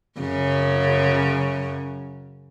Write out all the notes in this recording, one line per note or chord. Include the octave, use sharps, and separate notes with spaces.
F#2 C#3